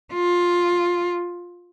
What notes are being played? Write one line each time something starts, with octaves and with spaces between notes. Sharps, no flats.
F4